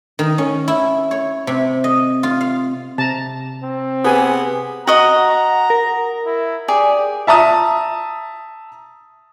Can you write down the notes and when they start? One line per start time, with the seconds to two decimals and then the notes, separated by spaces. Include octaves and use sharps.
0.19 D#3
0.38 C#4
0.68 E4
1.11 C#5
1.47 C3
1.84 D#5
2.23 F4
2.41 F5
2.98 C3 A5 A#5
3.63 C4
4.04 B3 G4 G#4 G#5
4.87 F#4 D#5 F#5 A#5
5.70 A#4
6.26 E4
6.68 G4 G#4 D5
7.27 E5 A5 A#5 D#6